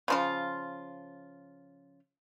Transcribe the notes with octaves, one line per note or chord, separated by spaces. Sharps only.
C#3 F3 F4